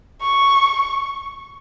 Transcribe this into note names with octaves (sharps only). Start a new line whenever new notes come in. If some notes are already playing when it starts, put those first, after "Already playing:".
C#6